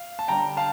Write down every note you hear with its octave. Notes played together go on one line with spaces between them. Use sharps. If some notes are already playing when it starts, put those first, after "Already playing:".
Already playing: F5
A5
D3 G3 D4 G5 A#5
F5 A5